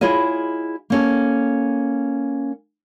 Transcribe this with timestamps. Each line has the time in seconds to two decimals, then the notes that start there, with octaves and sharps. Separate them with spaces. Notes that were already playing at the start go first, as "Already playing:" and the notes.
0.01 E4 F4 G#4 C#5 D#5
0.90 A#3 C#4 A4